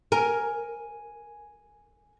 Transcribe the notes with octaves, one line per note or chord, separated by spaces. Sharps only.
A#4 G#5